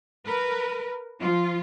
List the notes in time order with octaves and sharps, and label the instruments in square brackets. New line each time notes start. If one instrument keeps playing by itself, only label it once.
[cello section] A#4 B4
F3 F4